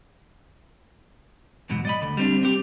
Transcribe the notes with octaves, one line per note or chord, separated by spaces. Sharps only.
E2 G#2 B2 F#3
D5 D#5 B5
D2
G3 C4 D4
C4 G4